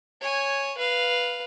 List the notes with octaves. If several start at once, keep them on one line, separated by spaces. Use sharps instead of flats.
C#5 G#5
B4 F5